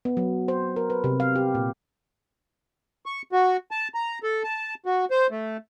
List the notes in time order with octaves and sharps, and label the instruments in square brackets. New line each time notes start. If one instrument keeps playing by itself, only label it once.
[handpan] B3
F#3
C5
A#4
B4
C3
F5
G4
A#2
[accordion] C#6
F#4
A5
A#5
A4
A5
F#4
C5
A3